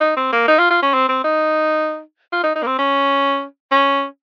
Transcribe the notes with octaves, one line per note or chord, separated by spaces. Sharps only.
D#4
C4
A#3
D#4
F4
F4
C#4
C4
C4
D#4
F4
D#4
D#4
A#3
C4
C#4
C#4